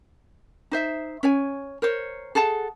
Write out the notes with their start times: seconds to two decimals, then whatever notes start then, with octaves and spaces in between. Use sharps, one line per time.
0.71 D#4 C5 E5
1.23 C#4 C#5 G#5
1.82 A#4 C5 C#5
2.35 G#4 A4 F#5 A5